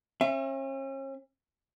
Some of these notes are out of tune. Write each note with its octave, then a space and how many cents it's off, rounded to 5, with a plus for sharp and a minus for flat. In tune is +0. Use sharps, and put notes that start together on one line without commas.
C#4 -40 E5 +25